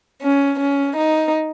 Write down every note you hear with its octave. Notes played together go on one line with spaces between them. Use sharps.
C#4
C#4
D#4